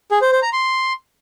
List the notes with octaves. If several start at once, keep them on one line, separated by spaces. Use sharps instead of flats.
G#4
C5
C5
A#5
C6